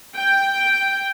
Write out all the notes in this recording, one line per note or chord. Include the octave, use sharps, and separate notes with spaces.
G5